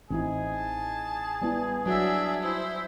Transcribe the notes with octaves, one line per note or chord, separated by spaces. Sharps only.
A1 C4 D#4 E4 G#4
A5
G3 B3 E4
F#3 D4 F#4 E5
E4 C5